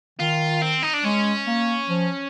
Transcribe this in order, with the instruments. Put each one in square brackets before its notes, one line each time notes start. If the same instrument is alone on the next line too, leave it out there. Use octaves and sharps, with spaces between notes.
[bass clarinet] D#3 [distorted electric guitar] F4
[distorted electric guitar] C4
D#4
D4
[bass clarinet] G#3 [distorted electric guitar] C#4
[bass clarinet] A#3
F3